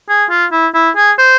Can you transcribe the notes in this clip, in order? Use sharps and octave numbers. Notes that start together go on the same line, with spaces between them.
G#4
F4
E4
E4
G#4
C5